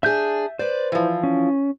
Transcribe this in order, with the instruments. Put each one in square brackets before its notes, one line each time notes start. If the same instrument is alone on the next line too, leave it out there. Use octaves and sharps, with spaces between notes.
[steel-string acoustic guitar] D4 G#4 [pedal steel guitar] E5 G6
[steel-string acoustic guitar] B4 D5 [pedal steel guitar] C5
[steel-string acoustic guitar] E3 F3
[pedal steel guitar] C#4